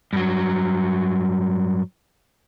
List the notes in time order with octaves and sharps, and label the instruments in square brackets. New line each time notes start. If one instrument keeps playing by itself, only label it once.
[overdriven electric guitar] G2 F#3